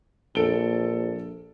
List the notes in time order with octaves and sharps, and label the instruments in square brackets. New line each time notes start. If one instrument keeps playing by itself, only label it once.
[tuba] A#1 [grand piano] A4 D7 G7